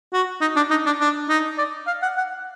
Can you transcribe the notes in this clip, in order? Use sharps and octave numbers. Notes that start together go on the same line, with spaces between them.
F#4
D#4
D4
D#4
D4
D4
D#4
D5
F5
F#5
F#5